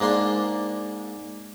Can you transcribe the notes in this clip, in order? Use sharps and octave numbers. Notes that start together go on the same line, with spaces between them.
G#2 A#3 D4 C6